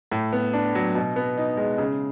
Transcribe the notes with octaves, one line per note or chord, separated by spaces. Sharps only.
A2
B3
D4
F#3
B2
B3
D#4
G#3
C#3